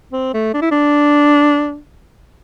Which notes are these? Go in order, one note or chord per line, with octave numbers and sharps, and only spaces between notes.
C4
A3
D4
E4
D4